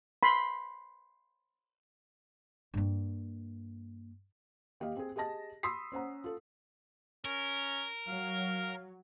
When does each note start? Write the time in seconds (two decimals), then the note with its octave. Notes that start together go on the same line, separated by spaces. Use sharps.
0.23 B5 C6
2.74 G2 A#3
4.80 D#2 G4 D#5 F5
4.97 C4 G#4
5.16 G4 G#4 D#5 A5 A#6
5.63 B5 C6 D#6 E6 B6 C7
5.92 C#4 C5 F#5 A#5
6.24 F4 A4
7.25 C#4 A#4
8.08 F#3 F5